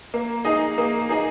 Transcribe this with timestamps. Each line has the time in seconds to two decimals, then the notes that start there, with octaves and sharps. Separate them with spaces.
0.14 A#3
0.45 D#4 G#4 D#5
0.78 A#3
1.09 D#4 G#4 D#5